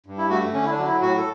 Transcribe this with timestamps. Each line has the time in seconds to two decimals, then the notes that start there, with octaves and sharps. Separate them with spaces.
0.06 G2
0.18 E4
0.30 A3 F#4
0.53 D3 C#4
0.65 E4
0.70 D4
0.78 F#3
0.86 E4
1.02 A2 F#4
1.18 A4